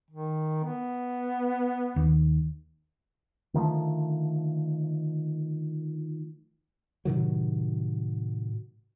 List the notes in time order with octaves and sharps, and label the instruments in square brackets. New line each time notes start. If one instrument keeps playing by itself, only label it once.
[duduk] D#3
B3
[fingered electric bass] D#2
[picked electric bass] D3 D#3 F3 A3
[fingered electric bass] A2 C3 D#3 F#3